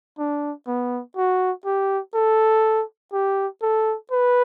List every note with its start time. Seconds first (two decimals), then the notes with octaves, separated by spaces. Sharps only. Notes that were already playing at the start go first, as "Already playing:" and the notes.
0.18 D4
0.67 B3
1.17 F#4
1.65 G4
2.14 A4
3.13 G4
3.62 A4
4.11 B4